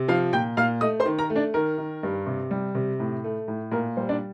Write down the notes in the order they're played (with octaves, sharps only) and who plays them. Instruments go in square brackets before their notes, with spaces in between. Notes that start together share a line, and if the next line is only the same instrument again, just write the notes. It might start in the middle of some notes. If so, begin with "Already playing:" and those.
Already playing: [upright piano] C3
F3 F5 F6
A#2 G5 G6
A#2 F5 F6
A3 D#5 D#6
C5 C6
D#3
A#4 A#5
A3
D4 D5
D#3 A#4
D#3
G2
C3
G3
C3
A2
A3
A2
A#2 A#4
G3 C5
D4 D5